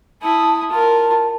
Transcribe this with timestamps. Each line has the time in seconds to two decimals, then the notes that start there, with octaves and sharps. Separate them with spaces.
0.22 E4 A5 D#6
0.71 F4 A#4 A5